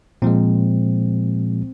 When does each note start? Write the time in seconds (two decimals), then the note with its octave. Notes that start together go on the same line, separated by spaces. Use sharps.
0.22 A#2 F3 G#3 C4